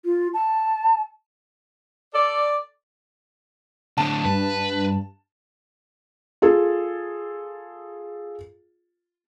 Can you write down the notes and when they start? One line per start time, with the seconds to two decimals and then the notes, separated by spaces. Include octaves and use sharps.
0.05 F4
0.34 A5
2.14 A4 D5
3.98 A2 D3 A5
4.25 G2 B4
6.42 F4 G#4 A4